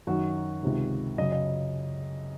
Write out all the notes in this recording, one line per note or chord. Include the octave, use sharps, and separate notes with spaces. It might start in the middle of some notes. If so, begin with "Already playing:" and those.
F#2 D#3 F#4
C#2 C3 D#3
F#2 C#3 D#5
D#5